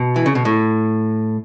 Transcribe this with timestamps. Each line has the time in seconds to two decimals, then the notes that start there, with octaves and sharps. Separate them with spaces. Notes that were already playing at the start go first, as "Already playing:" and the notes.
Already playing: B2
0.16 E3
0.26 C#3
0.35 B2
0.45 A2